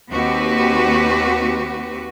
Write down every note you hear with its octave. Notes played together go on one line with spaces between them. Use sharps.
D#2 C4 F#4 G4 B4